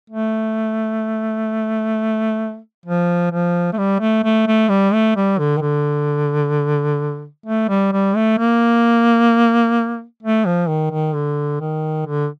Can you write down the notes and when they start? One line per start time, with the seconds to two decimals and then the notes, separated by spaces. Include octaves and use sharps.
0.10 A3
2.86 F3
3.31 F3
3.73 A3
3.78 G3
4.00 A3
4.24 A3
4.47 A3
4.69 G3
4.93 A3
5.16 G3
5.38 D3
5.57 D#3
5.61 D3
7.46 A3
7.69 G3
7.92 G3
8.16 A3
8.38 A#3
10.23 A3
10.45 F3
10.68 D#3
10.91 D#3
11.14 D3
11.60 D#3
12.06 D3